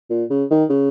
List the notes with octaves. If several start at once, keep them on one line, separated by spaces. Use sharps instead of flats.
A#2
C#3
D#3
C#3